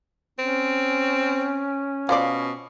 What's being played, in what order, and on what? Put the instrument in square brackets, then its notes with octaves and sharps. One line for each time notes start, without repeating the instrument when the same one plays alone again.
[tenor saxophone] C4 [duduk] C#4
[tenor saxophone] B2 [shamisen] F4 C5 D5